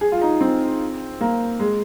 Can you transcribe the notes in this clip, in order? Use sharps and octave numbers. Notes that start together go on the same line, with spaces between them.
G#4
F4
D#4
C4
A#3
G#3